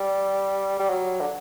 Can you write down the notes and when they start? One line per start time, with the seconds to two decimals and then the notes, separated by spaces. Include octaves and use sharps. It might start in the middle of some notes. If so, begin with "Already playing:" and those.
Already playing: G3
0.79 G3
0.89 F#3
1.20 D3